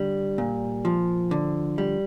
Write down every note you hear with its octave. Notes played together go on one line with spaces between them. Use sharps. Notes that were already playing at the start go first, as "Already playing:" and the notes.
Already playing: D3 G3
A#2
F3
D3
G3